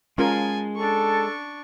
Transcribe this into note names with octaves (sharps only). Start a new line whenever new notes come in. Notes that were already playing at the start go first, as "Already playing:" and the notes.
G#3 C#4 F4 A#4 G#5 A5
D4 A4 C#6